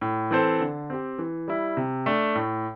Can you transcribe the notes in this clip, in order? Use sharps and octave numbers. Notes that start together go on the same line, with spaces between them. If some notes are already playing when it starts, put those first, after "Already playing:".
A2
E3 C4 A4 C5
D3
C4 G4
E3
G3 E4
C3
A3 D4
A2